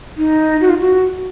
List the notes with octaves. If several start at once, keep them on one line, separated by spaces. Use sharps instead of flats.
D#4
F#4
F4
F#4